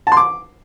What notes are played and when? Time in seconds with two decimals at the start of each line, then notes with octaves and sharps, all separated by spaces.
0.07 A5
0.12 C6
0.17 D6